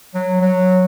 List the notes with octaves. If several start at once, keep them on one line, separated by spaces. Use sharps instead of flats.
F#3
F#3